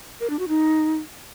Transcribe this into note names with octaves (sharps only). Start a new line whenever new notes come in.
A#4
D4
F#4
D#4